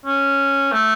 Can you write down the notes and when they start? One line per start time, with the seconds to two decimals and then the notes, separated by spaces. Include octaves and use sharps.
0.06 C#4
0.72 A3